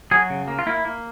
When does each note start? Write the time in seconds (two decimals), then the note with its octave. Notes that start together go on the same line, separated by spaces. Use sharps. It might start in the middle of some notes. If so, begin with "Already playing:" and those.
0.11 F#3 G#4
0.30 C#3
0.48 A#3
0.59 F4
0.66 A#3 E4
0.85 A#3